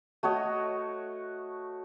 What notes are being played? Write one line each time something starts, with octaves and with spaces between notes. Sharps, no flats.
A3 F#4 C#5 D#5